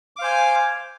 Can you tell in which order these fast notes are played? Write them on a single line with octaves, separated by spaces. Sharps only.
D6 F5 C5 G#5